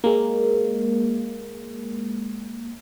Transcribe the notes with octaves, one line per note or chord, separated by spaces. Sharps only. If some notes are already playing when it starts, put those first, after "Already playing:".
G#3 A#3